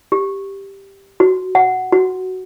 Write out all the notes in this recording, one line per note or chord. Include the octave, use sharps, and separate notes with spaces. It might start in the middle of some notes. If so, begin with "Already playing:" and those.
G4
F#4
F#5
F#4